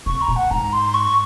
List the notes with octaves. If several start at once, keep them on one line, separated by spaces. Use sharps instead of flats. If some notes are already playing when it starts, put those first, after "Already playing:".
C3 C#6
A#5
A#2
F#5
G#2 A#5
C6
C#6